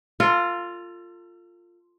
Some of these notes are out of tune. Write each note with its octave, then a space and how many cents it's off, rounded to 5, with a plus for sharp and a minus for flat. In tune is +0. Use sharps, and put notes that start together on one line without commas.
F4 +0 A4 +35